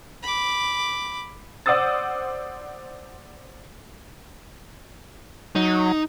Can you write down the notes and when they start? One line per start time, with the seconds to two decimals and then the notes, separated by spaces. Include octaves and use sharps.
0.23 B5 D6
1.66 C5 D5 F#5 D#6 E6 A6
5.55 F#3 D#4